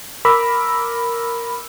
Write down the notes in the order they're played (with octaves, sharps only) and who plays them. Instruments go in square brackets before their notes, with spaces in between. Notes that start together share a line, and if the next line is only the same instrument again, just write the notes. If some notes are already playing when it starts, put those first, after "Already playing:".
[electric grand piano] A#4 D6 E6 [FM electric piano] B5